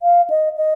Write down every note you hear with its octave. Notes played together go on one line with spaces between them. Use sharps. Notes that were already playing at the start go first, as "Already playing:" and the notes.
F5
D#5
D#5